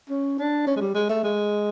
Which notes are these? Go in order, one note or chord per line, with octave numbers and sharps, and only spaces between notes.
C#4
D4
C#4
G#3
G3
G#3
A3
G#3